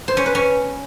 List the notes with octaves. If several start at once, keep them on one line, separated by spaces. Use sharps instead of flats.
C5
C#4
B4
C#4